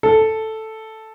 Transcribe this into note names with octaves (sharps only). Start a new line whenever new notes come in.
A4